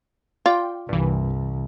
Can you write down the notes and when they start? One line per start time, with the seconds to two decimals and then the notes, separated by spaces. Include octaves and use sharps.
0.46 F4 D5 G5
0.89 C2 G2 E3